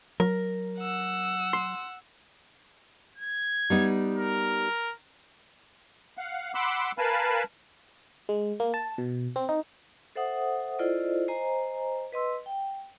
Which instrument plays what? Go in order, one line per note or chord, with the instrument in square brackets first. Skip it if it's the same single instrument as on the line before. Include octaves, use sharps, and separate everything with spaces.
[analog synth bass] F#3 [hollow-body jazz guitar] A#4
[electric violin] F#5 E6
[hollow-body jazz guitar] C6
[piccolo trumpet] G#6
[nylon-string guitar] G3 B3 D#4
[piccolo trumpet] A#4
[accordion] F5 F#5
F#5 B5 C6 D6 E6
A#4 B4 F5 G#5 A5 B5
[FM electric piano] G#3
A#3
A5
B2
C4
D#4
[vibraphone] A4 C5 E5 F#5 D#6
E4 F4 A4 C5 D5 D#5
C5 D#5 G#5 A#5
B4 D#5 C6 E6
G5